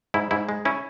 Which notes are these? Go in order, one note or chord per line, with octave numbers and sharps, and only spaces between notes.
G#2 E4
G#2 E4
G#3
C#4 E4